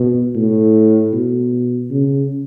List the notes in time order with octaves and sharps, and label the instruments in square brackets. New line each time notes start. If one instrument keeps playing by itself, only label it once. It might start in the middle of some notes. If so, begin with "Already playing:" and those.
Already playing: [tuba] B2
A2
B2
C#3